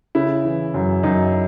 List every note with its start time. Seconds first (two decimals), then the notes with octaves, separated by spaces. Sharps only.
0.15 C#3 E4
0.45 E3
0.74 F#2
1.03 F#2 D#4